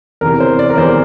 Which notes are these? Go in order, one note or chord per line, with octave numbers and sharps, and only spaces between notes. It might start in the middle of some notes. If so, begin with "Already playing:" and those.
E2 C3 E3 A#4
C5
D5
A#4
E2 C3 E3 C5